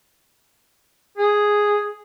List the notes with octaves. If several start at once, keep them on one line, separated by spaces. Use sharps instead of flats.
G#4